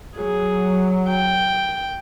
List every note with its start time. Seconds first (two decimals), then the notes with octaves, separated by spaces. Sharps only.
0.17 F#3 G#4
1.10 G5